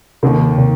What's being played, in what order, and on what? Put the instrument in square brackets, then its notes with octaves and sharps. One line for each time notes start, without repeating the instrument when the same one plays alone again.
[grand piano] D#2 D#3 A#3 [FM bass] C3
[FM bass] C3